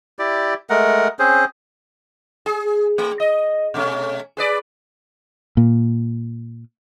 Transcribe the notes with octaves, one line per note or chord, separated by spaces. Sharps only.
E4 G4 D5
G#3 A3 A#4 F#5
C4 C#4 G#4 C5
G#4
A3
D#5
B2 A3 C#4
G#4 B4 D5
A#2